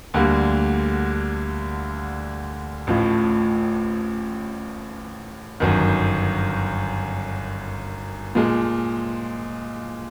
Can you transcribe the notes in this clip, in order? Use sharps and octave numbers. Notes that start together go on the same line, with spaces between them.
D2 D3 G3 A#3
A1 A2 F3
G1 F#2 D#3
A#2 F3 G#3